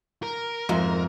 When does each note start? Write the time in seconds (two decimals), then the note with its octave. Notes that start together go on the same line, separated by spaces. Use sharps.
0.23 A#4
0.69 F2 G#2 F4 E5